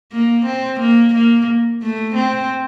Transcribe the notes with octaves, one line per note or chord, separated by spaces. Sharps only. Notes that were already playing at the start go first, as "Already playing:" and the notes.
A#3
C4
A#3
A#3
A3
C4